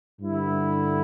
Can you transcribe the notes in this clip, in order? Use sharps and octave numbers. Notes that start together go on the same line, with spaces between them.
G2 D3 E4